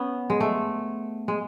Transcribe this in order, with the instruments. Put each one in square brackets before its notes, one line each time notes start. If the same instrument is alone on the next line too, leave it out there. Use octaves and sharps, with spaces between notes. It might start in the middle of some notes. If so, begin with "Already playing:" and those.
Already playing: [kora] B3 C#4
G#3
A3
G#3